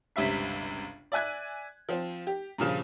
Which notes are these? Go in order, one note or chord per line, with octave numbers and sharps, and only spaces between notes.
G1 C#2 C3 E5 B6
D5 E5 G#5 F#6 G#6
F3 C4
G4
G2 A#2 C#3 F3